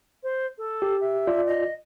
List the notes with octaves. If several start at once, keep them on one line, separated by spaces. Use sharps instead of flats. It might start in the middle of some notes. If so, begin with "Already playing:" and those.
C5
A4
G4
E5
F4 D5
D#5